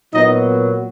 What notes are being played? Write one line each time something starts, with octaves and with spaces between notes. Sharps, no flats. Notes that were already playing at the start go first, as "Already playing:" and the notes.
A#2 F#3 B3 D#4 D#5